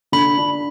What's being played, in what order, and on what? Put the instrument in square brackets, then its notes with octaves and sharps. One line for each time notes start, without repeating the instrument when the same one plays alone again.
[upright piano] D3 [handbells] B5
[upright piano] D4